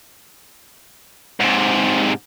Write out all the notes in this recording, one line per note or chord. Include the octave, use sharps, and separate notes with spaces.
G#2 C3